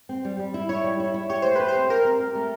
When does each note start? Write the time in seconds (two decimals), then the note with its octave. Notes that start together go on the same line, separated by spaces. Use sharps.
0.09 C4
0.25 G3
0.39 G3
0.54 E4
0.69 E4 C#5
0.84 G3
1.00 E4
1.14 E4
1.30 G4 C#5
1.42 A3 C5
1.56 G4 B4
1.68 C5
1.75 C4
1.89 G4 A#4
2.05 C4
2.20 G4
2.35 A3